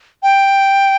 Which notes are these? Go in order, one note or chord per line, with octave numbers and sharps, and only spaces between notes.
G5